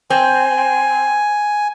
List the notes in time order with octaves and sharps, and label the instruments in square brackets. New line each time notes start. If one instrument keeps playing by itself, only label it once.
[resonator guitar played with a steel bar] C4 [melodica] G#5